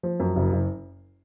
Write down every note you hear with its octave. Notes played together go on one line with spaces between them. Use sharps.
F3
F#2
F#1
F#1